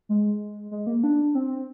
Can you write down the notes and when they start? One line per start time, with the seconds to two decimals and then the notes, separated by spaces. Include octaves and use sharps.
0.09 G#3
0.71 G#3
0.87 A#3
1.03 D4
1.35 C4